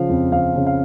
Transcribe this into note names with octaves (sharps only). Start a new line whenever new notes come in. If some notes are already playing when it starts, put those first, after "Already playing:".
Already playing: C#3 F3 F5
F2
F2 F5
C#3
F5